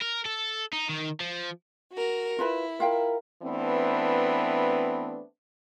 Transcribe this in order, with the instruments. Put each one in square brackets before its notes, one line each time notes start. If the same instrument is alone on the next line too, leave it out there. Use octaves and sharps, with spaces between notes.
[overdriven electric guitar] A#4
A4
D#4
D#3
F3
[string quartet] F#4 A#4
[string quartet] E4 [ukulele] F4 B4 B5
[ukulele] F4 F5 G5 [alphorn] A#4
[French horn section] E3 A3 B3 C4 D4